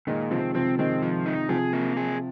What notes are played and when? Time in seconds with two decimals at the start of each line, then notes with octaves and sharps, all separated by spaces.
0.07 A#2 D#3 G#3
0.31 C3 F3 C4
0.55 C3 F3 C4
0.78 D#3 G#3 C4
1.03 F3
1.26 D#4
1.49 C3 F3 G#4
1.73 A#3
1.97 G#4